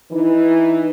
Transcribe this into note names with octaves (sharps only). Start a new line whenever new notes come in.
E3 D#4